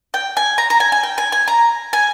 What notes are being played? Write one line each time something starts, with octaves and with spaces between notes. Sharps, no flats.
G5
G#5
A#5
A#5
G#5
G#5
G5
G#5
G#5
A#5
G#5